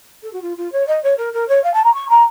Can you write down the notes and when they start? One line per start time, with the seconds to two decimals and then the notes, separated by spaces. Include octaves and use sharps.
0.23 A4
0.33 F#4
0.42 F4
0.57 F4
0.72 C#5
0.87 D#5
1.03 C#5
1.17 A#4
1.33 A#4
1.48 C#5
1.64 F5
1.74 A5
1.84 A#5
1.94 C#6
2.09 A#5